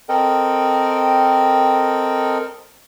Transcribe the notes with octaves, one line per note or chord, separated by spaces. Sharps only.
C4 A4 A#4 D#5 G5